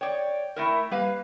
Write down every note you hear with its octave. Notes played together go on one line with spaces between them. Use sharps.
C#5 D5 G5
A3 E4 A#4
G3 A#3 B4 F5